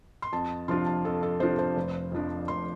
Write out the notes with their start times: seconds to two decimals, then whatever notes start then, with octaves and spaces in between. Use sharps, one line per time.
0.22 C6
0.32 F2 A5
0.68 C3 F3 D4 F4 C6
0.86 A5
1.05 F2 A4
1.23 A4
1.40 C3 F3 D4 F4 C5
1.59 C5
1.77 F1
2.12 F2 F3 D4
2.48 F1 C6